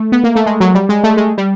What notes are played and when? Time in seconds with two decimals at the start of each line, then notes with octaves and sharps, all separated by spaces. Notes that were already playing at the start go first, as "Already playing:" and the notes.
Already playing: A3
0.12 B3
0.24 A#3
0.35 A3
0.46 G#3
0.60 F#3
0.75 G3
0.89 G#3
1.04 A3
1.17 G#3
1.38 G3